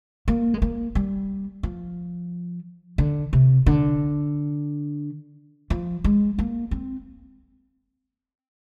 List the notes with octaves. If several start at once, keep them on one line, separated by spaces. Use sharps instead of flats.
A#3
G#3
A#3
G3
F3
D3
C3
D3
F3
G#3
A#3
C4